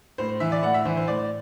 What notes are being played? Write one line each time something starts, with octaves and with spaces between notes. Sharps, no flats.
A2 C5
E3 E5
D5
A2 F#5
E5
E3 C5
C5
A2 D5